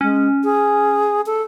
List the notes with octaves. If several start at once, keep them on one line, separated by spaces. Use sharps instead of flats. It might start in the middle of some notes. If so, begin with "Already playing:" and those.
G#3 C#4
G#4
A4